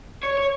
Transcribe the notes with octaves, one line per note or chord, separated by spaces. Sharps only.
C#5
C#5